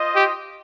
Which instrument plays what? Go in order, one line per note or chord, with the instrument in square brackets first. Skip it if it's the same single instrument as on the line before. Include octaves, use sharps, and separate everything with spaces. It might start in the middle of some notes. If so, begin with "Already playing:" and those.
Already playing: [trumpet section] F4 C5 D#5
[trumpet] G4